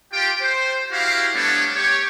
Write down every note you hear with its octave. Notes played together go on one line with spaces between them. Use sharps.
F4 G4 G5
C5
E4 F#4 G4 F5
G3 A3 B3 D4 A4 C#5
G4 C#5